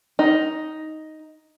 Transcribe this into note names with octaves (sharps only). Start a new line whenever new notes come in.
D#4